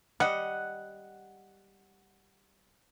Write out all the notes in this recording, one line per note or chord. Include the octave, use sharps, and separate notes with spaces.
G3 D#5 F#5